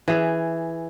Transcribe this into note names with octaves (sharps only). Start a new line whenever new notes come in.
E3 G#4